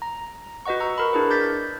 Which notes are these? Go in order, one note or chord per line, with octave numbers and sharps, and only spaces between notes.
A#5
F#4 B4 D#5 F#5 C#6
A#5 C#6 E6
A#4 B5
D4 E4 G#4 B4
D6 G6 A6 B6